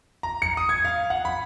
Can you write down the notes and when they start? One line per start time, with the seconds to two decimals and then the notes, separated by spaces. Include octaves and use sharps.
0.23 A#5
0.42 C#7
0.57 D#6
0.69 G#6
0.85 F5
1.10 F#5
1.25 B5